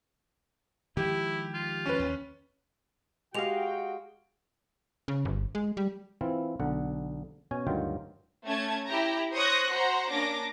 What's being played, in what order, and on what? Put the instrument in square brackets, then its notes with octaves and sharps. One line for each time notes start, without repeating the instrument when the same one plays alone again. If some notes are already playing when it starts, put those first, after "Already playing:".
[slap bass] D#3 F3 G#3 [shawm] E4 [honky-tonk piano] G4
[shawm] F4
[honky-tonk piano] C#4 B4
[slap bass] D#2
[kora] G#3 D#5 F5 [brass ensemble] F#4 G5 [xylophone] G4 F7
[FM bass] C#3
G1
G#3
G3
[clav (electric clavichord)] E3 C4 E4 F4
B1 D3 F#5
B2 C#4 G#5
D2 G2 D#3 F#3 F4 G5
[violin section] A3 C#4 A5 G#6
E4 G4 A#5
C5 C#5 C#6 D#6 F#6 A#6
F#4 C5 F#5 A#5
A#3 C#4 D4 D6 A#6